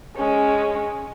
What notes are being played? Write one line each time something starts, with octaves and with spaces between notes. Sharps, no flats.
G#3 C#4